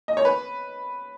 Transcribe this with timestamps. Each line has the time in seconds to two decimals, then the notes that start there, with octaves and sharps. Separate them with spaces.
0.08 D#5
0.17 C#5
0.25 B4